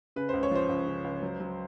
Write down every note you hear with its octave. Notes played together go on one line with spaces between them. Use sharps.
C#3 B4
C#2 C5
C#5
F3 C5
C#2
C#3
C#2
F#3
F#3